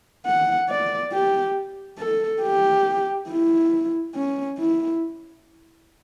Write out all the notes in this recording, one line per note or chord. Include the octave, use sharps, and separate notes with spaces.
F#5
D5
G4
A4
G4
E4
C#4
E4